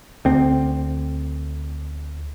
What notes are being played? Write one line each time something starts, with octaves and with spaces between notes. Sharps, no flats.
D2 C4